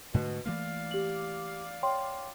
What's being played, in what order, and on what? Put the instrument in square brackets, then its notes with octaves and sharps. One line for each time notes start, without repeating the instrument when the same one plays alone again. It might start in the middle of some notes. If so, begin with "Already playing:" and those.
[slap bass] G#2 D3 A3 [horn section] B2
[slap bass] E3 A3 A#3 [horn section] D5 F5
[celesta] G4 F#7
C#5 G5 C6